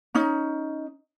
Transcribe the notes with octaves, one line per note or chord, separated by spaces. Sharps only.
C#4 D#4